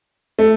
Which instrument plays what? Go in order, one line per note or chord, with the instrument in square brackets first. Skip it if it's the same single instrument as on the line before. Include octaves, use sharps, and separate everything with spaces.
[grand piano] A3